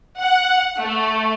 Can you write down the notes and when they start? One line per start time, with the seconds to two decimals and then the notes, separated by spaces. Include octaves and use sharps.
0.19 F#5
0.81 A3